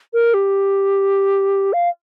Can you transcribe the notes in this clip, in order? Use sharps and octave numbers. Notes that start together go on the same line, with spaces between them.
A#4
G4
F5